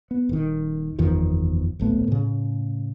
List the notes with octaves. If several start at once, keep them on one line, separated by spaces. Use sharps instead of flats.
B3
D#1 D#3
F#1 E2 D#3 F3
D1 A#1 A3 B3
A2 C#3